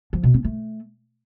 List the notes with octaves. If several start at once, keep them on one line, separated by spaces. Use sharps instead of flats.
F3
B2
C4
A3